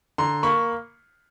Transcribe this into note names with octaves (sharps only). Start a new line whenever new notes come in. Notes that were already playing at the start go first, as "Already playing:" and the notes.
D3 A#5 C6
A#3 B5 C#6